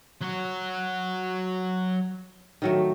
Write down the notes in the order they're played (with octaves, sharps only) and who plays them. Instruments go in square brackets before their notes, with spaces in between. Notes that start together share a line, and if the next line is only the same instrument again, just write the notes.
[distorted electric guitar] F#3 F#4
[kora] D#3 F#3 A3